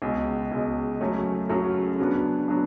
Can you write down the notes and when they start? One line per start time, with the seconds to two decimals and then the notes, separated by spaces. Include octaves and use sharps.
0.02 C#2 B2 G#3
0.52 C#2 B2 G#3
1.01 F#2 C#3 F#3 A3 C#4
1.49 F#2 C#3 F#3 A3 C#4
1.99 C#3 F#3 B3 D4
2.48 F#3 B3 D4